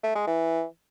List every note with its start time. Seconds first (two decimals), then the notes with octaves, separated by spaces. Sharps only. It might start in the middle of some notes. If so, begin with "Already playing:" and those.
0.03 A3
0.15 G#3
0.27 E3